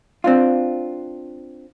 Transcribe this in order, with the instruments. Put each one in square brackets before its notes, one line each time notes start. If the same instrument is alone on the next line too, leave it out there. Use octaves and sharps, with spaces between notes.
[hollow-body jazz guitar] C4 D4 F4